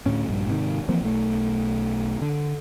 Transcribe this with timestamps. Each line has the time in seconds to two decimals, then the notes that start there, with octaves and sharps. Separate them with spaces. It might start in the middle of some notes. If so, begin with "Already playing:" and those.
0.06 D2 A2 C#4
0.28 A#1 G2
0.47 G#2 C3 D#3
0.89 E3 F3 A#3 C4
1.02 B1 A3
2.22 D3